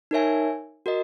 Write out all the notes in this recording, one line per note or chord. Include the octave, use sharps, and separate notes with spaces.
D#4 A#4 C#5 E5 G#5
F#4 A#4 D#5